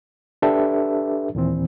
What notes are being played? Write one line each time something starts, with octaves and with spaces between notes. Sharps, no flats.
D4 G4 A4 B4 E5
D#2 A#2 E3 C4